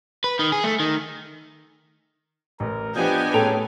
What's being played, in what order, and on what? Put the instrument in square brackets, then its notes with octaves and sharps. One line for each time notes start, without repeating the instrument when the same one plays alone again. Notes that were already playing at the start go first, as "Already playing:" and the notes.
[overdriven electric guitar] B4
D#3
G#4
A3
D#3
[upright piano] A1 [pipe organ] A#4
[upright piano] F3 [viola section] B3 G4 G#5 [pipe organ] D4 D#5 G5
[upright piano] A2 [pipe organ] C#4 G#4 [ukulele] A4 G5 A#5